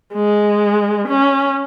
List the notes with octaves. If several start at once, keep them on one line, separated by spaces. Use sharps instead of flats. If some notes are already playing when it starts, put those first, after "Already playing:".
G#3
C#4